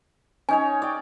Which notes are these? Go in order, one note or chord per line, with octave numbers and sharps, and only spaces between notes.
C#4 D#4 C#5 G#5
D5 G5